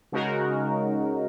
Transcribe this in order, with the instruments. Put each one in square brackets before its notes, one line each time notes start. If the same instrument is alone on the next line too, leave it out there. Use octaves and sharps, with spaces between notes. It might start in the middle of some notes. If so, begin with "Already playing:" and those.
[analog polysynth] C#3 G#3 D#4 F#4 A#4